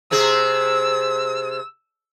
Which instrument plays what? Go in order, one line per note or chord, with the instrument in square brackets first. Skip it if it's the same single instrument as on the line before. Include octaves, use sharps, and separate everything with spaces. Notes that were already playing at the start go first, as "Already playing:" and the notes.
[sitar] C3 C4 G#4 [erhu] E6